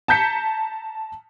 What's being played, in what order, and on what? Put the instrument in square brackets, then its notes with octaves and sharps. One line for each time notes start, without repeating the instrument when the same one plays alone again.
[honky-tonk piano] A5 A#5 G6 B6 C#7